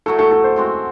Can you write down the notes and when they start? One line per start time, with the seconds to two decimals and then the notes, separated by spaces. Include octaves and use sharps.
0.06 A2 F#3 A3 A4
0.19 A4
0.31 A4
0.44 C5
0.56 G#3 C4 F#4